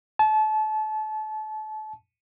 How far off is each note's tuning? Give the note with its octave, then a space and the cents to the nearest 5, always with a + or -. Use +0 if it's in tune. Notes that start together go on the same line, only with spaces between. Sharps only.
A5 -30